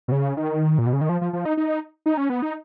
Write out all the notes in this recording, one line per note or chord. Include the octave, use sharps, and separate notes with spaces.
B2
C#3
D#3
A#2
B2
C#3
D#3
F3
F3
F3
D#4
D#4
D#4
C#4
B3
D#4